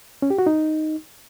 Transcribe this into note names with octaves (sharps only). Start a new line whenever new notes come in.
C#4
G4
F#4
D#4